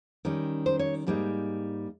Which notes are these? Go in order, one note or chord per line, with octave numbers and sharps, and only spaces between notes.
D#3 G3 C#4
C5
C#5
G#2 G3 A#3 D#4